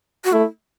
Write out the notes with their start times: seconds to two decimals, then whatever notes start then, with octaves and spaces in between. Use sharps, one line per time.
0.24 F#4
0.33 A3 E4